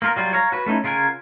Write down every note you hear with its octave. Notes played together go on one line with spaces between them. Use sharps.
A#3 F4 A#4
F#3 G3 F4
C#5 F5 A#5
F#4 B4
A3 C#4 D#4 E4
C#3 F4 A#4 F#5 G#5